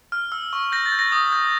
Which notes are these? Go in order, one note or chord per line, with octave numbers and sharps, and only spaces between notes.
F6
E6
C#6
G6 A#6
A6
G6
A#6
D#6
G6